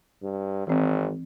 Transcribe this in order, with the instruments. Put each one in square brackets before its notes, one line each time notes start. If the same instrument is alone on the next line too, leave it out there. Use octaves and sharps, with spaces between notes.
[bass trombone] G2
[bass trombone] G#1 [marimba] E3 C4